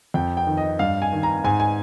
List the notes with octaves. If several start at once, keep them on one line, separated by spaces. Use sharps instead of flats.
F2 G5
G5
D#3
D#5
G2 F5
G#5
D#3
A#5
G#2 G#5
G#5